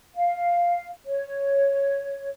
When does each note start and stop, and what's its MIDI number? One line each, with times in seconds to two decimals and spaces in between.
0.15 0.90 77
1.05 2.29 73